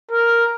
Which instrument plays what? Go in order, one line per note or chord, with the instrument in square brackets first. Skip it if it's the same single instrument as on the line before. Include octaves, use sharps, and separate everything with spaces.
[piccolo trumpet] A#4